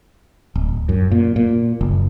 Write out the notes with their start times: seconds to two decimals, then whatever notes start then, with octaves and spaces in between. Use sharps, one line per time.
0.55 D1
0.89 F#2
1.11 A#2
1.36 A#2
1.81 F#1